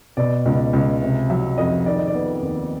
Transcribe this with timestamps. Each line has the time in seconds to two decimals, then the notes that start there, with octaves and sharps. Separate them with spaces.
0.17 B2 D5
0.46 C#2
0.73 C#2
1.02 C3
1.30 F#3 E5
1.58 F2 D#5
1.86 D#3 D5
1.97 D#5
2.07 D5
2.14 B3
2.42 D#2